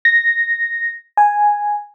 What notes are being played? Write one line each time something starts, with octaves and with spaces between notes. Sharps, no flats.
A#6
G#5